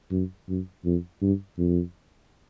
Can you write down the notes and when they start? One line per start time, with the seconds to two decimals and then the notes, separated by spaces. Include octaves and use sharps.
0.11 F#2
0.49 F#2
0.85 F2
1.22 G2
1.58 F2